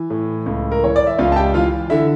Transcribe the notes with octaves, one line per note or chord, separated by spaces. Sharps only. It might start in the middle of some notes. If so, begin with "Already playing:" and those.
Already playing: E3
A2
C#2
A#4
E3 C#5
D5
E5
C#2 F4 F5
A5
G4 G5
E3 F4 F5
D3 E4 E5